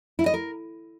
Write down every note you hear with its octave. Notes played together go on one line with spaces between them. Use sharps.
E4
D#5
A#4